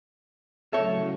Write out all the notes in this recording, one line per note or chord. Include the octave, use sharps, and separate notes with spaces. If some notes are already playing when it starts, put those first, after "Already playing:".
A2 C#3 F#3 A4 C#5 E5